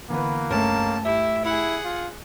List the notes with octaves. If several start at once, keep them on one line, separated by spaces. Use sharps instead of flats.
D3 E3 A#3 B3 B4
C#2 G2 A3 C#4 A#4 A5
E4 G4 E5
E4 G#4 F#5
F4